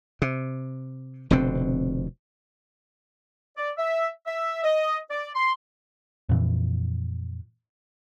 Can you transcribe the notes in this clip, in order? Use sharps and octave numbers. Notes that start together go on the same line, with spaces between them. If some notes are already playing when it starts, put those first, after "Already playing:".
C3
F1 B2 D3 C4
D5
E5
E5
D#5
D5
C6
F2 A#2 E3